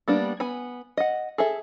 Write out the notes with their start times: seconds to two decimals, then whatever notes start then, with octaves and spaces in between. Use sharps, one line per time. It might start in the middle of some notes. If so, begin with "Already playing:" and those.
0.08 G3 A#3 B3 D4
0.40 B3 G#5 B5
0.97 D#5 F#5
1.38 G#4 A4 E5